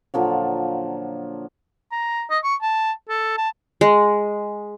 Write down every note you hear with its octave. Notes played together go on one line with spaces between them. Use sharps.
A#2 D3 F3 F#3
A#5
D#5
C#6
A5
A4
A5
G#3